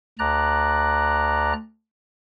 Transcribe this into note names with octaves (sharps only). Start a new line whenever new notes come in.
D2 D5 A#5 F#6